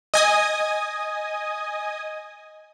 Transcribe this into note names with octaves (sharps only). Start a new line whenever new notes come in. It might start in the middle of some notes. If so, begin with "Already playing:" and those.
D#5 G#5 D#6